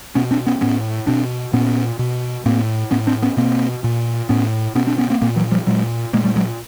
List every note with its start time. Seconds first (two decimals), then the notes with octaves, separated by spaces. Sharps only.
0.15 B2 B3 C#4
0.31 C4 D4
0.47 B3 C#4
0.61 A2 B3 C#4
1.07 B2 C4 D4
1.53 A#2 B3 C#4
1.99 B2
2.46 A2 A#3 C4
2.91 A2 B3 C#4
3.07 C4 D4
3.22 B3 C#4
3.37 B2 A#3 C4
3.84 A#2
4.29 A2 B3 C#4
4.75 B2 B3 C#4
4.87 C4 D4
4.98 B3 C#4
5.10 A#3 C4
5.21 A#2 A#3 C4
5.36 E3 F#3
5.51 F3 G3
5.67 A#2 F#3 G#3
6.13 A#2 G#3 A#3
6.24 G3 A3
6.36 F#3 G#3